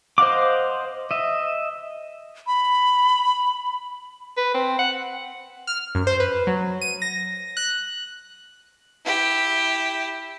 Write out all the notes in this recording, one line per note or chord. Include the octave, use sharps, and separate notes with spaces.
C5 D#5 F5 F#5 D6
D#5 E5
B5
B4
C4
F#5
F6
F#2
C5
B4
F#3
D#7
A#6
F#6
E4 G4